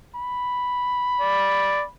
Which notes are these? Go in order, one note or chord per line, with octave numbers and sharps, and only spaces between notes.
B5
D5